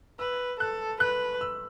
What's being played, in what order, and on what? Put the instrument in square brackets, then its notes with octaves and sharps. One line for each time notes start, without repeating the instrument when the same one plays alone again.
[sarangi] B4 [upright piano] E6
[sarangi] A4 [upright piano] F#6
[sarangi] B4 [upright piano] F#6
[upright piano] E6